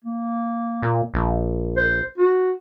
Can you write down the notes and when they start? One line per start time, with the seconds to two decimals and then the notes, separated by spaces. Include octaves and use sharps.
0.04 A#3
0.82 A#2
1.14 A#1
1.77 C5
2.18 F#4